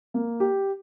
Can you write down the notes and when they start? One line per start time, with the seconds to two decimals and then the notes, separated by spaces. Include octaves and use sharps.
0.14 A#3
0.40 G4